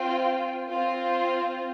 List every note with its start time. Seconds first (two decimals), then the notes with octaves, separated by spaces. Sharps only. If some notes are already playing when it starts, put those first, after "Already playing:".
Already playing: C4 F4 C5 G5
0.70 C4 F4 C5